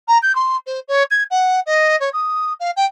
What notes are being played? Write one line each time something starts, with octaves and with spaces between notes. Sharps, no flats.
A#5
G6
C6
C5
C#5
G#6
F#5
D#5
C#5
D#6
F5
G5